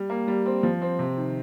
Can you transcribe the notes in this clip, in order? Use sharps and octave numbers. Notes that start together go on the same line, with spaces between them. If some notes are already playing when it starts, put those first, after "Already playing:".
Already playing: G3
A#3
G3
C4
F3
C4
C3
D#3